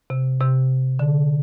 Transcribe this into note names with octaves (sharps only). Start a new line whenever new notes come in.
C3
C3
D3